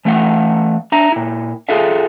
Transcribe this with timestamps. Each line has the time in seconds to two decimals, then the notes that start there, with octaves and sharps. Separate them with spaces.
0.05 E3 A3 F5 F#5
0.92 D4 E5 A#5
1.12 A#2 E4
1.69 F4 G#4 A4 E5 F5